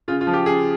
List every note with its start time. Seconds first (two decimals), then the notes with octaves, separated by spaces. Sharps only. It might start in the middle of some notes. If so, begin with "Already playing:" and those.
0.08 C#3 F4
0.21 F4
0.27 F3
0.33 G4
0.46 C#3 G#4